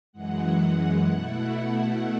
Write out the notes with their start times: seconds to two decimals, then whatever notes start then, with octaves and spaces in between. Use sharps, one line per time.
0.12 F#2 E3 G#3 F#5
1.07 B2 A3 E4